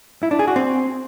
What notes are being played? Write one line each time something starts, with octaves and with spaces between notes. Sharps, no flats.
E4
D4
G#4
F#4
C4